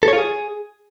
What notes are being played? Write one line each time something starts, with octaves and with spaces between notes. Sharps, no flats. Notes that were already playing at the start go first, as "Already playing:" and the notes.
A4
C#5
F4
G#4